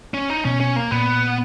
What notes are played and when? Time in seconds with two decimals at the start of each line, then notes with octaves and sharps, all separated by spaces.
0.14 C#4
0.30 D#4
0.45 B2 C#4
0.60 C#4
0.76 A#3
0.91 A#2 B3